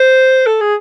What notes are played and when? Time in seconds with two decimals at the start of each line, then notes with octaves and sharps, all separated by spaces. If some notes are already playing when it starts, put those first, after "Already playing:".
Already playing: C5
0.46 A4
0.60 G#4